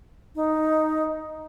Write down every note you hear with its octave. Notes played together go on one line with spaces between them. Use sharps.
D#4